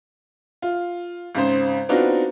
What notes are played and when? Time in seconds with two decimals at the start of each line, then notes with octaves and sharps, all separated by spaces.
0.62 F4
1.35 G#1 C#3 C5
1.89 B3 C4 D4 D#4 F4 F#4